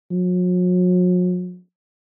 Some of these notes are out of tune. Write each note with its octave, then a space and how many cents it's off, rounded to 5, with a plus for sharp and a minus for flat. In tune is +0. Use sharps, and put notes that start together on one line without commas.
F#3 -45